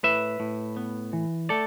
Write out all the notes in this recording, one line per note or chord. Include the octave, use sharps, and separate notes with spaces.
A2 B4 E5
A2
B3
E3
A3 A4 D5